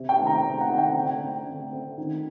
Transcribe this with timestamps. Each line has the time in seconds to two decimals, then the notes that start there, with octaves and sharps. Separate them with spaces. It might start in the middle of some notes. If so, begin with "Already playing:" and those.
Already playing: C3
0.09 G5
0.18 D#3 A3 C4
0.27 A#5
0.44 C3
0.61 F#5
0.70 D#3 A3 C4
0.78 G5
0.94 D3
1.21 A3 C4
1.46 D3
1.72 A3 C4
1.98 D#3